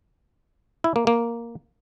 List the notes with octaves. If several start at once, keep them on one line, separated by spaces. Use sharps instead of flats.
E4
A#3
A#3